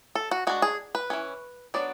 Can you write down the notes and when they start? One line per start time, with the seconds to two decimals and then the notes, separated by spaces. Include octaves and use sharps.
0.15 A4
0.31 F#4
0.47 G#3 D4 F#4
0.62 G#4
0.95 B4
1.10 E3 G#3 C#4
1.74 F#3 B3 D4 D5